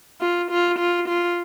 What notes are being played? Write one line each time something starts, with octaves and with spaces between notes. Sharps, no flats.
F4
F4
F4
F4